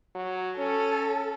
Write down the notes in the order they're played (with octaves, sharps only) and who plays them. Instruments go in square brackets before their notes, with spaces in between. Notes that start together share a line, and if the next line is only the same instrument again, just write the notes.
[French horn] F#3
[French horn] C#4 [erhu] A4